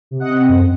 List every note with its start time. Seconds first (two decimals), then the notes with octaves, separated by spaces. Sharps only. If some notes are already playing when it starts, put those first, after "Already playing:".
0.11 C3
0.20 D#5 F#5
0.30 C4
0.48 F#2